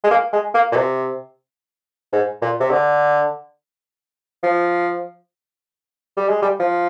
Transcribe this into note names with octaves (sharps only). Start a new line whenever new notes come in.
G#3
A#3
G#3
A#3
A#2
C3
G#2
A#2
C3
D3
F3
G3
G#3
G3
F3